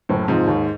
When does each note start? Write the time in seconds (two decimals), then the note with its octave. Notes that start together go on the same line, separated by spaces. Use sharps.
0.09 F#1 A2
0.28 F2 G#2 C3 F3
0.47 D#2